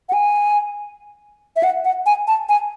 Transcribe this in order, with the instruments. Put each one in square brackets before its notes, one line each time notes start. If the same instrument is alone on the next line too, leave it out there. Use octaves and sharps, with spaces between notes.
[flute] F#5
G#5
E5
F#5
F#5
G#5
A5
G#5